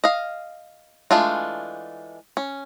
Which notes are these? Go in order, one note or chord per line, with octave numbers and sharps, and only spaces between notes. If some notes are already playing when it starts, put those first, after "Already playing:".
D#5 F5
E3 G#3 A3 D4 F4
C#4